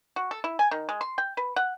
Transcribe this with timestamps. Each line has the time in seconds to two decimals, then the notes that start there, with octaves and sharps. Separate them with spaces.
0.16 F#4
0.31 A4
0.44 E4
0.59 G#5
0.71 D#3
0.89 G#3
1.01 C6
1.18 G5
1.37 B4
1.56 F#5